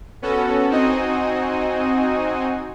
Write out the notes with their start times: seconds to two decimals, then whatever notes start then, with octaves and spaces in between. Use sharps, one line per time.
0.22 B3 C#4 F#4 A4
0.70 C4 D#4 F#4 D#5 G#5